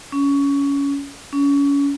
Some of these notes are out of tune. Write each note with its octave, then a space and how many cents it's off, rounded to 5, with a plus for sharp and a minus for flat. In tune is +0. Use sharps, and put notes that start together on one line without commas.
C#4 +20
C#4 +30